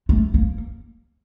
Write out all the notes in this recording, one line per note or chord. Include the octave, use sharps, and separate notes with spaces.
A3
A#3